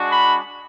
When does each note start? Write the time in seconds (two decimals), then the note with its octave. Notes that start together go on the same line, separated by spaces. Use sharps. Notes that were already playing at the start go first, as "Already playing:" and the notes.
Already playing: G#3 D4 F#4
0.10 B5